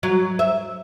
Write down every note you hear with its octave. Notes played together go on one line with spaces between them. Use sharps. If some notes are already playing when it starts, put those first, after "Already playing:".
F#3
E5